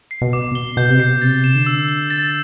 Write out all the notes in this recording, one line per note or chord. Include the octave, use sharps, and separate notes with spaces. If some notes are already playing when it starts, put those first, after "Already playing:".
C7
B2
D6
G7
B2 G6
C3
B2 C7
C3 A6
E7
D3
E6
G7
A6